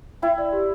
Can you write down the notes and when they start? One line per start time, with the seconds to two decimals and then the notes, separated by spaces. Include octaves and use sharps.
0.22 E4 G5
0.38 D5
0.52 G4